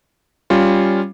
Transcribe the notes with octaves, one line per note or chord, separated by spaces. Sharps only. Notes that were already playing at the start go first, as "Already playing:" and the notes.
G3 C#4 F4